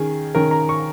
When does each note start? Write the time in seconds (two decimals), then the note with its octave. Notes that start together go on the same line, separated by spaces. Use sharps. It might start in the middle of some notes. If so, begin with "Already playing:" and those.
Already playing: D#3 C#4 G#4
0.35 D#3 C#4 A#4
0.51 A#5
0.69 C#6